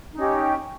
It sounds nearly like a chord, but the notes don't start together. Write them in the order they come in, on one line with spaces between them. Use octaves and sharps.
D#4 C#4 G4